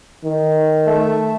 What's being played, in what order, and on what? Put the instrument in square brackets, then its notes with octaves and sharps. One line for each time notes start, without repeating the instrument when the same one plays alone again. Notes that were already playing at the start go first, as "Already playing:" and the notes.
[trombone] D#3
[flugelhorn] A3 [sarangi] E5